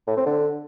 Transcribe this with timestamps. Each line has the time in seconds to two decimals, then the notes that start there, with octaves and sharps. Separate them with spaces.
0.07 A2
0.17 C4
0.26 D3